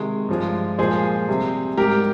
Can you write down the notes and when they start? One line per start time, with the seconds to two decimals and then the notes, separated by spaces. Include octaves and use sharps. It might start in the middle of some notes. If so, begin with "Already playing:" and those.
Already playing: C3 D#3 G#3
0.29 G2 F3 G#3
0.79 A#2 F3 G#3 G#4 C5
1.28 C3 G3
1.77 G#2 G3 G4 A#4